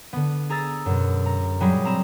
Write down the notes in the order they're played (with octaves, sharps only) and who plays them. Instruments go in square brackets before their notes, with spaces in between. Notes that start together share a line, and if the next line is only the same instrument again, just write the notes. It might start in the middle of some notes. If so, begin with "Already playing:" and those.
[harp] D3 B3
G#4 A#5 E6 A6
F#2 B2
A#5
A#2 F#3 G3 G#4 B5
C4 A#5 B5 E7